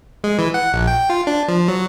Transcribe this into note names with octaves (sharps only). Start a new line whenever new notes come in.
G#3
E3
F#5
A#1
G5
F4
D4
F3
F#3